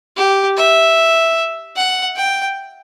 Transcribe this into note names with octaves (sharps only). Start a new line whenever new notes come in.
G4
E5
F#5
G5